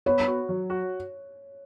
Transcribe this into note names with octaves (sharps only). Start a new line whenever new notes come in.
B3 C#5
F#4
F#3
F#4